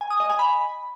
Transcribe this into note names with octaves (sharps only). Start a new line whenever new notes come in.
G#5
D#6
D#5
G#5
B5